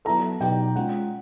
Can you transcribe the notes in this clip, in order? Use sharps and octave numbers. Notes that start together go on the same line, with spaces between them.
F#3 B3 E4 A4 A#5
B2 F#3 B3 D#4 G4 G5
G#3 C#4 F4 F#5